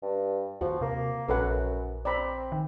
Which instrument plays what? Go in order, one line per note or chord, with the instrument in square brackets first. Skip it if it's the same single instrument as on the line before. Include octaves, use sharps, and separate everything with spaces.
[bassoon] G2
[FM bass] D#2 [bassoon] F3 [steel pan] F#4
[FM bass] C3 [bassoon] A#3
[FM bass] A#1 [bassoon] F#2 [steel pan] A4 B4 F#5
[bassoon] C4 [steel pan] D5 A#5 B5
[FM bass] D#3